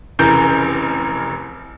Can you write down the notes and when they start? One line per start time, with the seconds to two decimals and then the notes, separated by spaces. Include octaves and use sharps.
0.19 F1 C#3 E3 A#4 G6